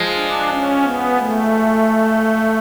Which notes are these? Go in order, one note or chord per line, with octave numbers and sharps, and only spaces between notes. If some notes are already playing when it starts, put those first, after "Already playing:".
Already playing: F3 G#3
D4
C#4
B3
A3